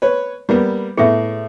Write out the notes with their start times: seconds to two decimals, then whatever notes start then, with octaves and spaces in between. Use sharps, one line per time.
0.02 B4 C#5
0.49 G3 A#3 B3
0.97 A2 B3 G#4 E5